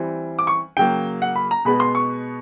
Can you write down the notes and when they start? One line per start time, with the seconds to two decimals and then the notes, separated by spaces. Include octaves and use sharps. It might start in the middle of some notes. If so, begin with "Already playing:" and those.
Already playing: E3 G3 C4
0.39 D6
0.47 C#6
0.77 C#3 F#3 A#3 G5
1.22 F#5
1.36 B5
1.51 A#5
1.65 B2 G#3 B3 B5
1.80 C6
1.95 C#6